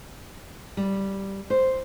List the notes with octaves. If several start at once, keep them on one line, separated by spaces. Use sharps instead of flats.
G3
C5